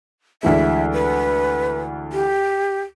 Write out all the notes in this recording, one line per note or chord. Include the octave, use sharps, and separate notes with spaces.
D2 E3 G#3 E5
B4
G4